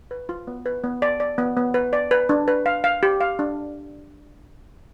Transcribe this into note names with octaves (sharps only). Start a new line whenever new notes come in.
B4
F4
B3
B4
B3
D5
D5
B3
B3
B4
D5
B4
D4
B4
F5
F5
G4
F5
D4